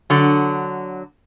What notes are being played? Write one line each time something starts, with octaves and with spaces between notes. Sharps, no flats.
D3 F#3